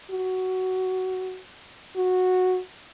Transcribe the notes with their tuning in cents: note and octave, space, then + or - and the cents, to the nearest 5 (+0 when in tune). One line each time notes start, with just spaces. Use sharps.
F#4 +10
F#4 -10